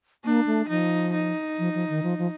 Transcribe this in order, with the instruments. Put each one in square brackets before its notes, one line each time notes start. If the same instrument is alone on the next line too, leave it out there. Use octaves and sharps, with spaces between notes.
[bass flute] A#3 [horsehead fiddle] D4
[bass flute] A3
[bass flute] F3 [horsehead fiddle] D#4
[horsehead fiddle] D#4
[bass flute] F3
F3
D#3
F3
F3